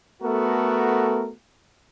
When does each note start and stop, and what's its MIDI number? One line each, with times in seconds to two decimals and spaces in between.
0.22 1.30 57
0.22 1.30 59
0.22 1.30 66
0.22 1.30 69
0.22 1.30 70